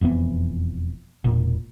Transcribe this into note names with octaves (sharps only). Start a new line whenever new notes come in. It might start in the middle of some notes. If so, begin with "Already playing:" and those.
E1 F2 E3 B3
E1 A#2